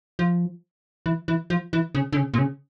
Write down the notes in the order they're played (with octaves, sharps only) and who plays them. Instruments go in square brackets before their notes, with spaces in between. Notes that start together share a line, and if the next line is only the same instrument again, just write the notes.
[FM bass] F3
E3
E3
F3
E3
C#3
D3
C#3
A#2
C#3